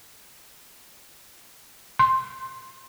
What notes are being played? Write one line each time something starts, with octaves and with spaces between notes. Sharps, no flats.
C6